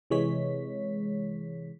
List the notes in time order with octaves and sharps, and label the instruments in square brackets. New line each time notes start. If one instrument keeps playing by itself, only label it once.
[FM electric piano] C3 E3 G#3 C#5 B6